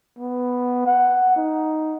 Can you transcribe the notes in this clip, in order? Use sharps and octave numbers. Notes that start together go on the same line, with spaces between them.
B3
F#5
D#4